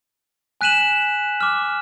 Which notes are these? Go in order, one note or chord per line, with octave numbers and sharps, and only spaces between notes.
G#5 F#6 B6 D#7 E7 F#7
D6 F6